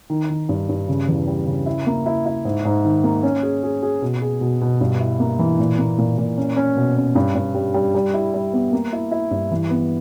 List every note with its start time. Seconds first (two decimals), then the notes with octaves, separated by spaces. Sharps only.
0.10 D#3
0.30 D#3
0.49 G2
0.69 G2
0.88 C#3
1.08 E2
1.27 G3
1.47 C#3
1.66 E4
1.87 A#3
2.06 E4
2.26 E4
2.45 G#2
2.65 G#2
2.85 D#3
3.04 A#3
3.23 C#4
3.43 G#4
3.63 G#4
3.83 G#4
4.02 B2
4.22 G#4
4.41 B2
4.61 B2
4.81 G2
5.00 E4
5.20 A#3
5.39 E3
5.59 A#2
5.79 A#3
5.98 A#2
6.18 A#2
6.38 C#4
6.56 C#4
6.76 B2
6.96 C#4
7.15 G2
7.35 G2
7.55 G3
7.74 G3
7.95 G3
8.14 E4
8.34 G3
8.53 B3
8.73 A#3
8.93 E4
9.11 E4
9.31 G2
9.51 E3
9.71 B3